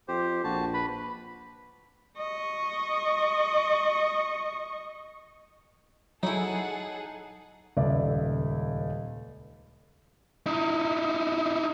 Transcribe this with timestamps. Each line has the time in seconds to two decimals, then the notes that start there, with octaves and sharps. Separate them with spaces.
0.08 F2 G4 C5
0.44 A#1 F#4 A5
0.74 B4 B5
2.17 D#5 C#6
6.23 F#3 D#4 E4 G#4 A4 F#5
7.77 D#1 C#2 D5 E5
10.46 D#4 E4